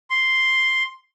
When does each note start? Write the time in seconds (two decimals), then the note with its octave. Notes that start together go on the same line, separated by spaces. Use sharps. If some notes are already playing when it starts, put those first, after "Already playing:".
0.10 C6